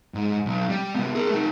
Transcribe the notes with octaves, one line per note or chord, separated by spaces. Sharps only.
G#2
B1
G3
C3 B3
G#4 A#4
A3 D#4